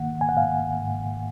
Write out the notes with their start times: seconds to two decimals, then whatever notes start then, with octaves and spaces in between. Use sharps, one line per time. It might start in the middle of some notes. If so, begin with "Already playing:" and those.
Already playing: D#3 A#3 F#5
0.21 G#5
0.29 F#5
0.36 G#2 F5
0.81 G#2